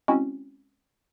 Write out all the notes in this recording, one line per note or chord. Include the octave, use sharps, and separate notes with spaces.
G#3 C4 C#4 E4 F#4